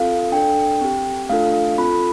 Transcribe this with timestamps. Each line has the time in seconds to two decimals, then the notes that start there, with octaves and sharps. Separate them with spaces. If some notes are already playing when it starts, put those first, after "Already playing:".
Already playing: C4 F4 A4 F5
0.32 D4 A4 G5
0.81 C4 G4
1.29 A3 D4 F4 A4 F5
1.78 C4 F4 A4 B5